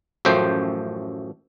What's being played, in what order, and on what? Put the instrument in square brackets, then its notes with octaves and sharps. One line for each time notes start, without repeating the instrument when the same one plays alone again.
[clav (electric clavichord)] A1 F#2 F3 A3 C5 G5